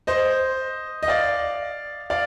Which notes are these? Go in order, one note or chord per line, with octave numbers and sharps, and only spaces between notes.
C5 D#5
D#5
D5 F5
D5 F5